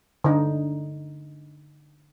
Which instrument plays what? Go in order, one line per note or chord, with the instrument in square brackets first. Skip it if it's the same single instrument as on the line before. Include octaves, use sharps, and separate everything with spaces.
[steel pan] D3 D#4